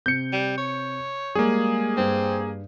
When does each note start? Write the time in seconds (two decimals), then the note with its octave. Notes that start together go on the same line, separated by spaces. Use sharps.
0.06 C3 G6 C#7
0.32 G3
0.58 C#5
1.35 G3 G#3 A#3 G#4
1.97 G2 C4